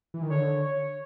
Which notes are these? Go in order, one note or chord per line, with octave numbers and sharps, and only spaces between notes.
E3
D#3
D3 C#5
C#5